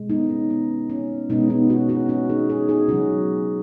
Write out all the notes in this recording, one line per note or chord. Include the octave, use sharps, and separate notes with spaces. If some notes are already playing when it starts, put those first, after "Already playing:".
Already playing: B2 G#3
B3 D#4
C#4
B3
C#4
B2 G#3 B3 D#4
B3 D#4
C#4 F#4
C#4 F#4
C#4 F#4
D#4 G#4
D#4 G#4
D#4 G#4
C#3 F#3 C#4 F#4